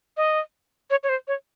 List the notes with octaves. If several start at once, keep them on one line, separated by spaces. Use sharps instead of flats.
D#5
C#5
C#5
C5
C#5